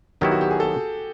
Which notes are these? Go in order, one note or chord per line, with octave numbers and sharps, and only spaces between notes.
D#3 F#3 B3 E4 G4
F#4
G4
G#4
A4